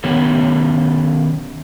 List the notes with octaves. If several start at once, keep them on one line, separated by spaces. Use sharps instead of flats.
D#3 B3 C#4 G4 C#5